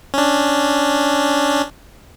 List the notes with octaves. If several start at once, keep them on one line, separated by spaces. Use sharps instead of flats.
C#4 D4